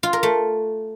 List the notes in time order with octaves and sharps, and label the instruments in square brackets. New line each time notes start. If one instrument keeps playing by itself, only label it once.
[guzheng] F4
A#4
A3